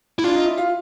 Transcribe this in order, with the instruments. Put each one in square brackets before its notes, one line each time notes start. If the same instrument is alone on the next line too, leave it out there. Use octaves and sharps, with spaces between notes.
[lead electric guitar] E4
[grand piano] D4 [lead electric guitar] F4
[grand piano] D#4
E4
F4